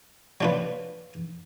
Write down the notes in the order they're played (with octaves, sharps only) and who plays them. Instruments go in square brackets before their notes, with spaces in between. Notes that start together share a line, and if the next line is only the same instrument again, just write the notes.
[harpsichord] F#3 D4 F4 B4